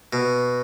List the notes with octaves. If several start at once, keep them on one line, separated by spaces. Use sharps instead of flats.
B2